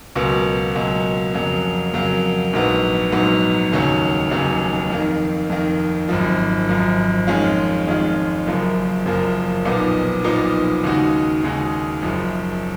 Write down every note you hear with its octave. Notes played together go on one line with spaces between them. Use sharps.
C#2 B2 F#3 A#3
C#2 B2 F#3 A#3
F2 C#3 F#3 A#3
F2 C#3 F#3 A#3
A#1 G#2 F#3 B3
A#1 G#2 F#3 B3
F1 D#2 C#3 F#3 C#4
F1 D#2 C#3 F#3 C#4
F2 D#3 A#3
F2 D#3 A#3
G#1 F#2 F3
G#1 F#2 F3
F2 D#3 G#3 C#4 F4
F2 D#3 G#3 C#4 F4
F#1 F#2 F3 A#3
F#1 F#2 F3 A#3
B1 A#2 F3 B3 D#4
B1 A#2 F3 B3 D#4
D#2 C#3 G#3 D#4 F#4
D#2 C#3 G#3 D#4 F#4
F#1 F#2 F3